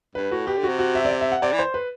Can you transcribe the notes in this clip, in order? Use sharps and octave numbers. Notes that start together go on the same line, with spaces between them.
G2 B4
A2 F#4
B2 G4
D3
F#4
C3
F#4
E5
D5
E5
E5
F#5
C3 D5
E3
C5
B4